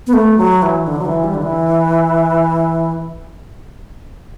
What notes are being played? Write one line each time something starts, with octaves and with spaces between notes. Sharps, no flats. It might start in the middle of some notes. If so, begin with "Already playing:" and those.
B3
A3
F#3
E3
D3
F#3
E3
G3
D3
E3